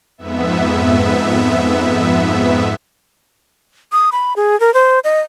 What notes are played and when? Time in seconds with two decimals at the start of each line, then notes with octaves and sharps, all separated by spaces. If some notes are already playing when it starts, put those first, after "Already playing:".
0.18 F2 G#2 B3 E5
3.92 D#6
4.12 B5
4.36 G#4
4.60 A#4
4.74 C5
5.04 D#5